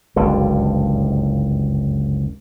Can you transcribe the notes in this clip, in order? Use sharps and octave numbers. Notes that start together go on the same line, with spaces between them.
F#1 C#2 G2 D3